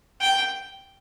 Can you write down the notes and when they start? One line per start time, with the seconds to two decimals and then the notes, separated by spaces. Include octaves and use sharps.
0.21 G5